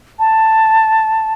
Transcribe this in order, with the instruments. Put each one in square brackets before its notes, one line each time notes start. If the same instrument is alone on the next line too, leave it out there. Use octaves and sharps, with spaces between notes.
[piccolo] A5